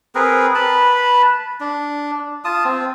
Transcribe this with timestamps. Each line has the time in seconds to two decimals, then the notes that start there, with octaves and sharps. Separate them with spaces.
0.15 C4 G#4 A#4 B4
0.55 B4 A5 B5
1.60 D4
2.45 F4 A5 D#6
2.65 C4